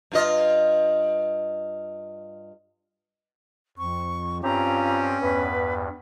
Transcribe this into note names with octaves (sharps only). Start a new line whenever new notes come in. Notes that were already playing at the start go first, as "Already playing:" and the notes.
G2 F4 D#5
F2 C4 C#6
G2 C4 C#4 F4 G4 A#5
E2 G2 B3 B4